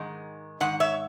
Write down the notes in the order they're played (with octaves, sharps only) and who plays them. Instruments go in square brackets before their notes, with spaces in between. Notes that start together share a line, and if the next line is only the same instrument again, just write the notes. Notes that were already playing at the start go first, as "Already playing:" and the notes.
Already playing: [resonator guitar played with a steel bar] G#2 D#3 G#3
G#2 D#3 F#5
C#5 E5